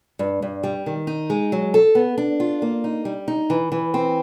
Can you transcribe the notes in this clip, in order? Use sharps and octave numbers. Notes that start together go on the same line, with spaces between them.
G2
G2
G3
D#3
D#4
G#3
F#3
A4
B3
D4
F4
A#3
D#4
G3
D#4
E3
E3
C4